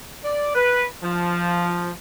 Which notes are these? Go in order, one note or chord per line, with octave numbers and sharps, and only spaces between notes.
D5
B4
F3